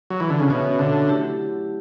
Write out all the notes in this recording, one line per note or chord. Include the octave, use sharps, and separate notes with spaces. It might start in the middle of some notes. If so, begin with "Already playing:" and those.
F#3
E3
D3
C#3
B2 C#4 F#4 C#5 E5
D3
F#3 A3 E4 G4